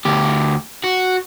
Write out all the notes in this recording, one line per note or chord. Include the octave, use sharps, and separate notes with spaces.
D2 G4
F#4